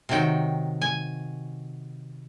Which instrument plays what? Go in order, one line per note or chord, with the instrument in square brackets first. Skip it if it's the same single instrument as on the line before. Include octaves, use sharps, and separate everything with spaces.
[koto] C3 D#3 F#3 G5
G#5